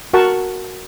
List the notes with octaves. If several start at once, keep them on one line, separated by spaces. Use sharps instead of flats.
F#4 A#4 F#5 A5 C#6